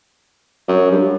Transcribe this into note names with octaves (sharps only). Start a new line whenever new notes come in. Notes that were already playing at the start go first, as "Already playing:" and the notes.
F#2
G2